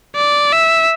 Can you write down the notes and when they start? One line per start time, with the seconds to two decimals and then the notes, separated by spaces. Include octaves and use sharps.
0.15 D5
0.52 E5